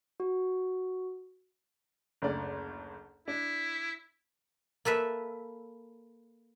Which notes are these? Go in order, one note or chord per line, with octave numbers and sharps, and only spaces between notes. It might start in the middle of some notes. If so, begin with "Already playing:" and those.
F#4
F#1 D2 D5
D4 E4
A#3 A4 B4 E5